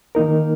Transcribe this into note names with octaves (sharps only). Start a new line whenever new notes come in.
D#3 A#3 D#4 A#4